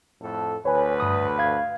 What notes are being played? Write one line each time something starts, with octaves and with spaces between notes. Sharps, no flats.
F2 A2 A4
D2 B4 C#5 G#5
G2 D#6
F5 G#6